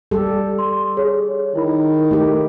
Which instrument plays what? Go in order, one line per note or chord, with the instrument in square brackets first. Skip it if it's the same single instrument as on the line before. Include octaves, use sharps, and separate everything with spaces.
[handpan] G3 G4 A4
[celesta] C6
G#4 C#5
[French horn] D#3 [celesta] E4 B5
[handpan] A3 G4